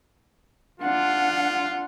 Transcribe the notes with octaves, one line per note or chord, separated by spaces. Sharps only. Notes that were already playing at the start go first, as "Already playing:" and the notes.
D4 F4 F#5